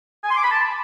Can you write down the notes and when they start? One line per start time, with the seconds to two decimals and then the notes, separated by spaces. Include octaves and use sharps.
0.24 G#5
0.31 C6
0.37 D6
0.44 B5
0.50 A5